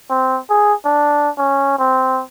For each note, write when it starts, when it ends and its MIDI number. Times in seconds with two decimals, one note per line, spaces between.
0.10 0.39 60
0.50 0.74 68
0.85 1.29 62
1.38 1.74 61
1.79 2.22 60